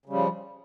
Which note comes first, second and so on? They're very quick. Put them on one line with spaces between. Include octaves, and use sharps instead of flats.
C#3 G3 F3